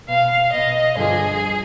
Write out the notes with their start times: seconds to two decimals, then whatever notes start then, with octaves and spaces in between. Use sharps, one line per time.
0.08 B2 F5
0.52 B2 D#5
0.96 G2 D3 F3 G#4